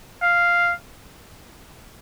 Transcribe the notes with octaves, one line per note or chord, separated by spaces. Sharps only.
F5